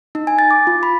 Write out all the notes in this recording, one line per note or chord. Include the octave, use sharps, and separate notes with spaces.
D#4
G#5
A6
D6
F4
B5